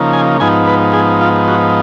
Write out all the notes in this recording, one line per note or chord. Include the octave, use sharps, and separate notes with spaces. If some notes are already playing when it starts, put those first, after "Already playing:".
Already playing: C#3 F3 A#3 D#4
G#5
G#2 F3 B3 D#4 G#5
B4
G#4
F4
F#4